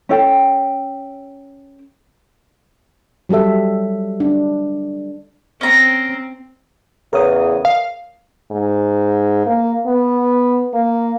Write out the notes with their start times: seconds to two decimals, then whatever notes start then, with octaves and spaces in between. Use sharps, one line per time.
0.09 C#4 A4 G5
3.29 F#3 G3 G4 A4 E5
4.20 D4
5.61 C4 C#4 A#5
7.13 E2 C#3 A#4 C#5 D#6
7.65 F5
8.51 G#2
9.47 A#3
9.86 B3
10.74 A#3